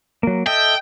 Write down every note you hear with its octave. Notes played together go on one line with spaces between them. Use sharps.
F#3 A#3
A4 D#5 E5 G5